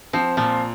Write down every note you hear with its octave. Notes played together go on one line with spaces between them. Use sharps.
F3 C4
A#2 F3